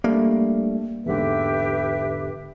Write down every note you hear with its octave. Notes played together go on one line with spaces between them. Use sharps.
G3 A3 A#3 D4
E2 G#2 D3 G4 B4 E5